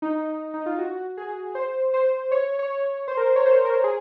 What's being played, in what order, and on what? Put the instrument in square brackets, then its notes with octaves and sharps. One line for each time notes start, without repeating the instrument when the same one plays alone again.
[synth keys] D#4
D#4
F4
F#4
G#4
C5
C5
C#5
C#5
C5
A#4
C5
C#5
C5
A#4
G#4